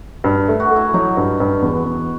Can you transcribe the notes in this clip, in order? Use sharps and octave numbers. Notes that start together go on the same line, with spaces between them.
G2
A3
F#4
A3
E4
F#3 D#4
G2
G2
E2
E2